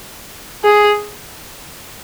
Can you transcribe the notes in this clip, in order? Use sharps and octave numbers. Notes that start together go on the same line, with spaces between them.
G#4